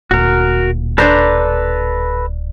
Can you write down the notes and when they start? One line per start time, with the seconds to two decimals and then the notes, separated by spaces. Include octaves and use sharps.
0.11 D1 A#2 F#4 A#4
0.98 D4 A4 B4 C5 D5 A#5